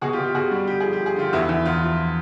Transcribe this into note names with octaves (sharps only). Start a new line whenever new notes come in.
B2 F#4 G#4
F4 G4
B2
F4 G4
B2 F#4 G#4
G3
D3 G4
F3 G#4
G4
F3
G#4
D3 F4 G4
E2 E4 F#4
E2 E4
E2 F4
F3